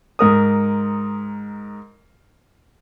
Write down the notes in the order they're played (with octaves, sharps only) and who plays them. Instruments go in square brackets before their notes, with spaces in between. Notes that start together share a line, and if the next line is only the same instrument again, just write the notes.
[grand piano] G#2 A#4 D#6